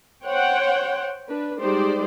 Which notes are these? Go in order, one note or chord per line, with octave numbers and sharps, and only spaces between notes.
C5 C#5 F#5 G5
D4 B4
G3 G#3 D#4 G4 C5 D5